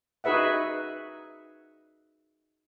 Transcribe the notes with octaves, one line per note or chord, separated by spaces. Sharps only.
D#4 F#4 G#4 B4 E5 F#5